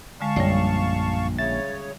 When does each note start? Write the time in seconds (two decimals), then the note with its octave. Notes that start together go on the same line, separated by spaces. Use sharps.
0.21 D3 G#3 F5 A5 C#6
0.36 A#1 F#2 G3 C#5 D5 C7
1.39 C#3 C#5 E5 A6